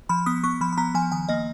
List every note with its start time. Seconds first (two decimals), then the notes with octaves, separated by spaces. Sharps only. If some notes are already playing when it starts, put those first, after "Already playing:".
0.09 F3 B5
0.26 B3 D#6
0.44 B3 C#6
0.61 F3 B5
0.73 B5
0.77 B3 A#5
0.94 F3 G#5
1.12 D#3 G#5
1.29 A#3 D#5